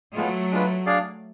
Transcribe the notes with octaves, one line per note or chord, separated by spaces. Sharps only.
F#3 G#3 A3 B3 F4
G#3 D4 F4 B4
D4 G#4 D5 F5